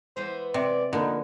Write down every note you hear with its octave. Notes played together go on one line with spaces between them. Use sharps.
E3 G#3 B3 C5
C3 D5
D3 F3 A#3 D#4 B4